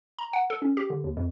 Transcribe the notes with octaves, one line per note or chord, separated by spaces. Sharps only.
A#5
F#5
A4
C#4
G4
D3
D#2
F2